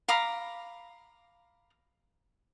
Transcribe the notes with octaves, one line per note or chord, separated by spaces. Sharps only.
F5 A#5 B5 D6